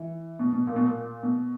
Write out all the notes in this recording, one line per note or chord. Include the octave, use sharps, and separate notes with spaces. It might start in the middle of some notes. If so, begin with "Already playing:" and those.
Already playing: E3
B2
B2
A#2
B2
A#2
B2